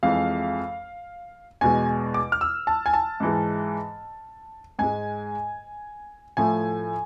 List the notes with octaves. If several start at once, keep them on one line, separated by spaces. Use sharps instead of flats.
F2 E3 G#3 F5
E2 B2 G#3 G#5
D6
F6
E6
A5
G#5
A5
G#2 E3 G#3
G#2 G#3 G#5
A2 F3 A3 G#5